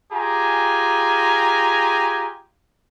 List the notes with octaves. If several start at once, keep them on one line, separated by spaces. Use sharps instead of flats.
F4 G4 G#4 G#5 A#5